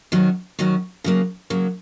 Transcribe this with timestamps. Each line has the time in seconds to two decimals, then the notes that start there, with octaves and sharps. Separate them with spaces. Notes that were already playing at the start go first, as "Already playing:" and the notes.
0.12 D#3 F#3 C#4 F#4
0.59 D#3 F#3 C#4 F#4
1.04 C#3 F#3 A#3
1.50 C#3 F#3 A#3